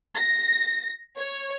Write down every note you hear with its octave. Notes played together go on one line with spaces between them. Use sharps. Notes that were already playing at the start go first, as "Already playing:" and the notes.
A#6
C#5